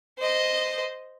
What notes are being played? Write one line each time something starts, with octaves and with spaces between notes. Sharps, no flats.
C5 D#5